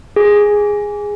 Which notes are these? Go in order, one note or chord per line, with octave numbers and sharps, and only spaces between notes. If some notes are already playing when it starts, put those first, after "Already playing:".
G#4